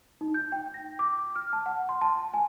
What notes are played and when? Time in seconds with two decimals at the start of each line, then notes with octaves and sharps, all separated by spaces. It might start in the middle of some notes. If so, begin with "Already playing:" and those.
0.21 D#4
0.34 G6
0.52 G5
0.74 A#6
0.99 D6
1.36 F6
1.53 A5
1.66 F#5
1.89 C6
2.01 A5
2.34 G#5